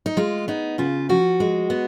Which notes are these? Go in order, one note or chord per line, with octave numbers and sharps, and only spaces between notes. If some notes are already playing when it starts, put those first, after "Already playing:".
D#4
G#3 F4
B3 D#4
C#3 F4
F3 F#4
G#3
B3